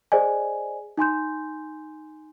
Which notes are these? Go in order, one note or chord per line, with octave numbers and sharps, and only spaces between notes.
G#4 C5 D5 D#5 G#5
D#4 G#5 C6 G6